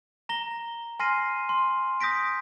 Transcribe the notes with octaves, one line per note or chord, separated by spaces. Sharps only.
A#5 A#6 G7
G#5 C6 F6 A#6 C7 D#7
C6
D#6 G6 A#6 B6 D7